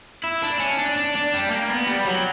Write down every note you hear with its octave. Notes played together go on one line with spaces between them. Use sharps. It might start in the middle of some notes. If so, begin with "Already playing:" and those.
E4
D4
C#4
D4
D4
D4
G3
A#3
B3
G3
F#3